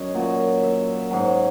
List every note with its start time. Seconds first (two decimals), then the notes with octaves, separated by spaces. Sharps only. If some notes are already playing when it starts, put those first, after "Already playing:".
Already playing: F#2 C#5 D#5
0.14 A#2 F#3
0.63 E5
1.11 G#2 F#3